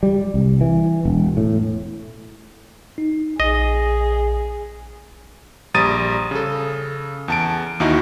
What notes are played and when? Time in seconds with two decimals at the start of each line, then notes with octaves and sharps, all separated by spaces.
0.03 G3
0.34 C2
0.61 E3
1.05 E1
1.37 A2
2.98 D#4
3.40 A#1 G#4 D#5
5.74 A#1 G3 A#5 D#6 A6 D#7
6.31 C#3 A4
7.28 E2 A5 D7
7.80 D#2 D#4 E4 F#4